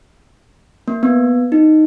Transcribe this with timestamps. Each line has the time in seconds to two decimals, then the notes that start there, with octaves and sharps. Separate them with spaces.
0.88 A#3
1.03 B3
1.52 D#4